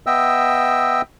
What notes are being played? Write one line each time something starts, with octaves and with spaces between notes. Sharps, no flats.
B3 D#5 E5 G5 E6